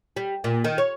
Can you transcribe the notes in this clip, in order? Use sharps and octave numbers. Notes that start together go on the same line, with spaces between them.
G3
A#2
D#3
C#5